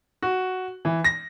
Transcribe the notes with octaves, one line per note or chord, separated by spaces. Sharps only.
F#4
E3
A#6